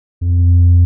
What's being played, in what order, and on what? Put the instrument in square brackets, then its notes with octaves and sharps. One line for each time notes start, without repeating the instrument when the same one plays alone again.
[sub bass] F2